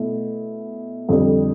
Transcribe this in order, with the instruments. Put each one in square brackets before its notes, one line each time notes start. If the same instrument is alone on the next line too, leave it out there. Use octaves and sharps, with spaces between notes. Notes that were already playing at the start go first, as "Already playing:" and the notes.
Already playing: [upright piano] B2 A3 E4
F2 D3 G3 C4